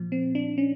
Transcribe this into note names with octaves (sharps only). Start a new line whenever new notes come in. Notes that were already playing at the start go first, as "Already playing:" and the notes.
Already playing: A#2 F3
C4
D4
C#4